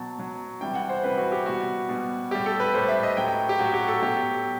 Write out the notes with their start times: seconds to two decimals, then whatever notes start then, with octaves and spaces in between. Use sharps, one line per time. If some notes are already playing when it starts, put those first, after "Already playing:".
Already playing: B2 F#3 A5
0.18 B2 F#3
0.61 C3 E3 G3 G5
0.75 F#5
0.89 C5
1.04 C3 E3 G3 B4
1.18 F#4
1.32 G4
1.46 B2 G3 F#4
1.89 B2 G3
2.31 A2 G3 G4
2.46 A4
2.60 B4
2.74 A2 G3 C5
2.88 E5
3.03 D#5
3.17 A2 F#3 G5
3.28 G5
3.49 G4
3.59 A2 F#3 F#4
3.74 G4
3.88 A4
4.02 B2 F#3 G4